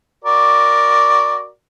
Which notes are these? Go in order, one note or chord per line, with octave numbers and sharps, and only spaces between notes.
F#4 A#4 D5